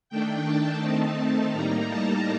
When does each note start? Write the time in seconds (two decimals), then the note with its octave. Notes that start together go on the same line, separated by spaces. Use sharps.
0.10 D#3 A3 D4 G5
0.46 A5
0.81 D#3 A3 C4 D#4
1.52 A2 G3 A#3 D#4 A#5
1.88 A5